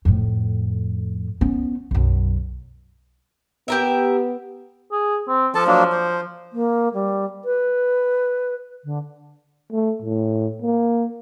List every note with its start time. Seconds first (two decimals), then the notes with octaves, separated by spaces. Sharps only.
0.05 F2 A2
1.41 B3 C#4
1.91 B1 F#2
3.68 B3 G4 A#4 E5
4.92 G#4
5.28 C4
5.55 F3 A4 A5
5.67 F#3 A#3 D4
5.92 C5
6.53 A#3
6.94 G3
7.45 B4
8.84 D3
9.72 A3
10.02 A2
10.62 A#3